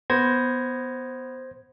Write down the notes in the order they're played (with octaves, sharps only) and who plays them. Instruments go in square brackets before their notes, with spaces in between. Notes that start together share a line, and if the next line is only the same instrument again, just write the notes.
[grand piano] B3 [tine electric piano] C5 G#6 A#6